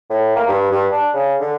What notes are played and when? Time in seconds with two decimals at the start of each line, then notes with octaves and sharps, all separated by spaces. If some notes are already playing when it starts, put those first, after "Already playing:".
0.10 A2
0.36 A#3
0.48 G2
0.71 G2
0.91 D4
1.13 C#3
1.40 D3